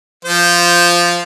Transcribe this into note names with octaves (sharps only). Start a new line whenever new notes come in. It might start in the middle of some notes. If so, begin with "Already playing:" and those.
F3 C5